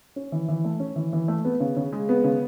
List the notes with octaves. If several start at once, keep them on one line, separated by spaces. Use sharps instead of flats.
C#4
E3
E3
A3
C#4
E3
E3
A3
B3
C#3
C#3
G#3
B3
C#3